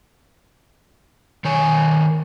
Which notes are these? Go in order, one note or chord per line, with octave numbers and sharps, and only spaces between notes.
D#3 C#5 G#5